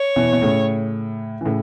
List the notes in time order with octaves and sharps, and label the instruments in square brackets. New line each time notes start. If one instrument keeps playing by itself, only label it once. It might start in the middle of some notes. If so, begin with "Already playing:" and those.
Already playing: [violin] C#5
[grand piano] B2 E3
B2
A2 C#3
E3
A2 C#3